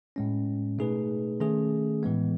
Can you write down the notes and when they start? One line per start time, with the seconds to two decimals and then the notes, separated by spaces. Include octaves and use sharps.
0.16 A2 G#3 C#4
0.78 B2 A3 D#4 G#4 B4
1.40 D#3 A3 C#4 G#4
2.03 A2 E3 G#3 B3